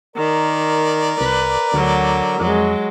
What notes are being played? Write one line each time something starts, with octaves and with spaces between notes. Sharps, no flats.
D#3 A#4 D5
C2 B4
D2 D3 F#3
F2 F#3 G#3